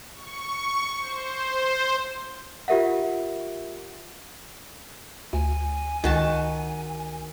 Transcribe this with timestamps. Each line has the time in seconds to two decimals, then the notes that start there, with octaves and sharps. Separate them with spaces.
0.15 C#6
0.99 C5
2.68 F4 G4 A#4 E5 F#5
5.33 D2 G#5
6.04 C#2 D#3 F#4 A5